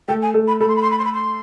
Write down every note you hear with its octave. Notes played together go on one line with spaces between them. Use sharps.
A3 A4 G5
G#5
A3 A4
B5
A3 A4 B5
C6
B5
C6
B5
C6
B5
C6